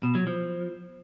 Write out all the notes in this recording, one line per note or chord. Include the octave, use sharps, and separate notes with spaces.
B2
F#3
F3